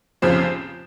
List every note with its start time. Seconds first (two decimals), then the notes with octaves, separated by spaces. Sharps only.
0.22 F1 F2 C#3 F3 C5